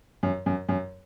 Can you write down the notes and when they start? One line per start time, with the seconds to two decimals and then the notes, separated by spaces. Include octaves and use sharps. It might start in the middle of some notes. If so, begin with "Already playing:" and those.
0.23 F#2
0.46 F#2
0.69 F#2